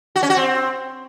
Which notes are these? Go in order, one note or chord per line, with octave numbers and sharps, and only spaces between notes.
F#4
C#4
F#4
C4